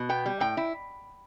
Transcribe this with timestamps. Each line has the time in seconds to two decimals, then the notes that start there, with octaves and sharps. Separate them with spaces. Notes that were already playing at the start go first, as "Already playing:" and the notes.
Already playing: B2
0.09 B3 G5
0.26 G3
0.40 A2 G5
0.57 E4